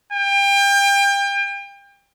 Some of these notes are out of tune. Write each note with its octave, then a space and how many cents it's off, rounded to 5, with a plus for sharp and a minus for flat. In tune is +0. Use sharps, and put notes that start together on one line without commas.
G5 +30